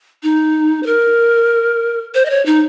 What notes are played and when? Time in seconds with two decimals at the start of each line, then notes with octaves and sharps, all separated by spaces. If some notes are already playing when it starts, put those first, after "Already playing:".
0.23 D#4
0.83 C5
0.86 A#4
2.15 C5
2.25 D#5
2.30 C#5
2.46 D#4